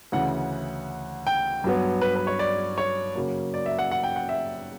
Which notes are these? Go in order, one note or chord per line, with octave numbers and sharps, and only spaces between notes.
D2 C#3 E3 F#5
G5
G2 F#3 B3
B4
B4
C#5
D5
C#5
F#2 C#3 F#3 A#3
D5
E5
F#5
F#5
G5
F#5
E5